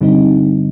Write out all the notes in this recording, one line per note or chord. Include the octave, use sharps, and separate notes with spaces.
G2 D3 G3 C4 D#4